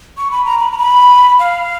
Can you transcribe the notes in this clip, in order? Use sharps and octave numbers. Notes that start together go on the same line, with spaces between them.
C#6
B5
A#5
B5
A#5
B5
F5